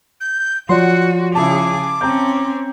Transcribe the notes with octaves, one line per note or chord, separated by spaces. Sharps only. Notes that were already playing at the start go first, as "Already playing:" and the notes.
G6
F3 F#4 C#5 D5 F#5 C6
C#3 E4 G#4 A5 D6
C4 C#4 G5 A#5 G6